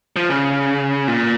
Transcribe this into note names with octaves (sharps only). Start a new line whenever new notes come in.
F3
C#3
A#2